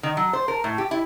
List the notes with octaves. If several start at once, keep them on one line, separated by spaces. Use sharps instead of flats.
D#3
F#3
C5
A#4
A2
G4
E4